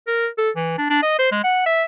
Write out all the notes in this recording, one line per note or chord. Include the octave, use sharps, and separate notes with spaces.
A#4
A4
E3
D4
D4
D#5
C5
G#3
F#5
E5